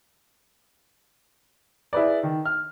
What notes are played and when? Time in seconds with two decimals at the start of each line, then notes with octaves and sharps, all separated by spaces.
1.93 E4 G#4 B4 D5
2.23 D#3
2.45 F6